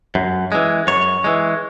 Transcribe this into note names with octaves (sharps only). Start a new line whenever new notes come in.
F#2
E3 G#3
F#2 C#5
E3 G#3